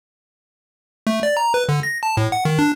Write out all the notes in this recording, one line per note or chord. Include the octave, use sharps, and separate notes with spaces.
A3
D5
A#5
B4
D3
A#6
A5
A2
F#5
D#3
D4